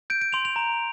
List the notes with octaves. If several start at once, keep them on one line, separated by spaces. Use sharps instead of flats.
G6 D7
D7
C6 F7
F7
A#5